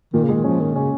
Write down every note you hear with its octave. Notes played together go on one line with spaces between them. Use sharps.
A#2 D#3
C#3
G#3
D#3
F3 C#4
D#3 C#4
C#3 C#4